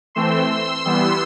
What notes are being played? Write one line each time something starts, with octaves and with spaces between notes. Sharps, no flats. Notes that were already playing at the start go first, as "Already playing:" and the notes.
E3 A3 C4 C6 E6
C6 E6
E3 G3 B3